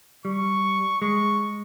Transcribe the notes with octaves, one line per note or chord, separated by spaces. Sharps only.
G3 C#6
G#3 C#6